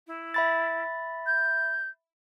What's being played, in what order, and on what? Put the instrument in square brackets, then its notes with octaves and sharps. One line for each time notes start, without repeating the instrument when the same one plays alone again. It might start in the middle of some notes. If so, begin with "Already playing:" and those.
[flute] E4
[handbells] E5 B5 A6
[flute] G6